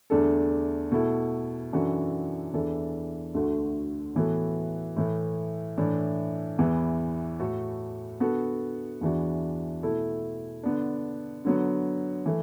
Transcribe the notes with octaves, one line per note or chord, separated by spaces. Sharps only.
E2 D3 A3 D4 A4
B2 A3 E4 A4
F#2 E3 D4 F#4 A4
E2 E3 D4 A4
D2 D3 A3 F#4
A2 E3 B3 F#4 A4
A2 E3 A3
A2 E3 D4
E2 E3 B3
A2 A3 F#4 A4
D3 B3 F#4 A4
E2 E3 D4 F#4
B2 A3 E4 A4
D3 B3 D4
D3 F#3 B3
E3 A3